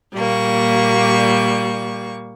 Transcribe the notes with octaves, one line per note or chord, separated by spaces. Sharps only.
A#2 G3 A#3 C#6